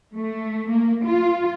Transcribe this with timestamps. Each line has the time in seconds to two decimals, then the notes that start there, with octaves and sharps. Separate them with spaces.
0.16 A3
0.70 A#3
1.05 F4